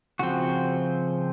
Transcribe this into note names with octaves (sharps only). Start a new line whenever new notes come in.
C#3 F3 C4 F#4